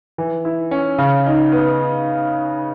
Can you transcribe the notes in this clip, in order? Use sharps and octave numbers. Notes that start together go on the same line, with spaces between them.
E3
E4
C#4
C#3
D#4
B3